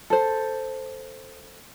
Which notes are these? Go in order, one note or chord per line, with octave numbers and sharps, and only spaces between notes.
A4 C5